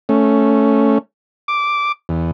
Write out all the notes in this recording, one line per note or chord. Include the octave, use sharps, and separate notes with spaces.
A3 C#4
D6
E2